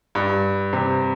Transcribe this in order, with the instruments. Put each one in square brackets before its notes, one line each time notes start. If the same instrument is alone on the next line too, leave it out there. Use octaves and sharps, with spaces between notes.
[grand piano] G2
C3